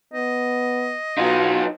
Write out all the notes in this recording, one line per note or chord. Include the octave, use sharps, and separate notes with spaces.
B3 D#5
B2 F#3 D#4 F4